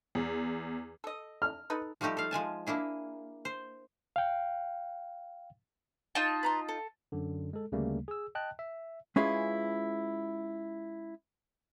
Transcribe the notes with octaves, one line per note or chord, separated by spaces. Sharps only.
E2
A4 D#5
F6
D#4 A4 B4
F3 G3 A3 D#4 G4
A4 F5
F3 G#3 G#5 A5
A#3 D4 E4 G#4
C5
F5 G5
D#4 F4 A5
B4 A#5 C6
A4
F#2 D3
G#3 A4
D2 C#3 G3 A3 A#3
G#4 E6
D#5 G5 A5 F#6
E5
G#3 C#4 E4 F4 G#4 B4